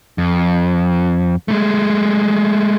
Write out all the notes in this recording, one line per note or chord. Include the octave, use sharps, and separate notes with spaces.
F2
G#3 A3